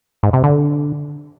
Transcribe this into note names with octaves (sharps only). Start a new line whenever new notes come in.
G#2
C3
D3